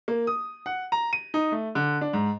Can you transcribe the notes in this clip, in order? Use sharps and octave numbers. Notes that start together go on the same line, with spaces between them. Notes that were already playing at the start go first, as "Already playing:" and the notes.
A#3
D#6
F#5
A#5
D#7
D#4
A3
D3
D4
G#2